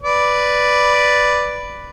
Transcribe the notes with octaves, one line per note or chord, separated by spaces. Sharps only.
B4 D5